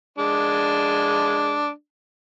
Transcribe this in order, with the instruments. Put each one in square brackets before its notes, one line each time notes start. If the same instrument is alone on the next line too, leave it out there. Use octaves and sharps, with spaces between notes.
[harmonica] G#3 D4